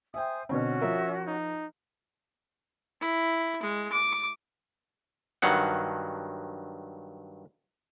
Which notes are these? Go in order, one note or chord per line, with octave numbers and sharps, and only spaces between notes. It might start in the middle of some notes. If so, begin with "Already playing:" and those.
C5 E5 G5 G#5 D#6
B2 D3 C4 C#4 F#4
F3 A#4 E5
D#4
E4
G#3
D6
G2 D#3 F#3 F#5